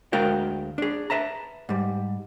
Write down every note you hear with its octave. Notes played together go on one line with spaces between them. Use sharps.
D2 G#3 F#4 A#4 F5 G5
D4 G#4
B4 E5 A5 A#5
G#2 G3